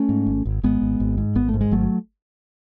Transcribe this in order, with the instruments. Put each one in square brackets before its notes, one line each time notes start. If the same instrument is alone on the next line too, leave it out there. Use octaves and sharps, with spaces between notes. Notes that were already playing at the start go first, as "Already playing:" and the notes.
Already playing: [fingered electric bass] A3 C#4
G#2
G#1
G#1
G#1 G#3 B3
G#1
G#1
G#2
G#1 B3
A3
G#2
G#3
G#1 F#3 A3